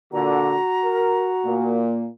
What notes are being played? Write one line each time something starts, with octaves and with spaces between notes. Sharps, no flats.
A#2 D3 F#4 A#5
A#4
A#2 A#3